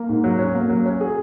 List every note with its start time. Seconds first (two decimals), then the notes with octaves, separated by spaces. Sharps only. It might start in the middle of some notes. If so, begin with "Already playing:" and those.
Already playing: A#3
0.09 G#2
0.24 F#3
0.39 C#4
0.55 A#3
0.70 F#3
0.86 C#4
1.01 G#4